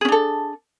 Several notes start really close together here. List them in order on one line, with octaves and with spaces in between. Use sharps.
G#4 C#4 D4 A4